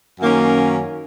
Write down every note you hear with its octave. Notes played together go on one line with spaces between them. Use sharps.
F#2 D#3 A#3 C#4